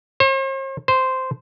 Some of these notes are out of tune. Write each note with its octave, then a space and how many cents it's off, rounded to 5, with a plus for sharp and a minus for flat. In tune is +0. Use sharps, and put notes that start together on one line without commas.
C5 +45
C5 -10